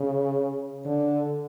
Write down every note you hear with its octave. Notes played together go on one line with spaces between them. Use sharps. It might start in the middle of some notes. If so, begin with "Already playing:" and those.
Already playing: C#3
D3